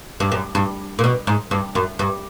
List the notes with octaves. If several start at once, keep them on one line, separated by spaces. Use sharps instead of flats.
G2
F#2
G2
A#2
B2
G#2
G2
F#2
G2